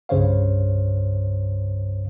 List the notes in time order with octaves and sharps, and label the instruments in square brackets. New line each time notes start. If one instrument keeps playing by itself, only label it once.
[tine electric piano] C2 G2 C#3 C5 C#5 F5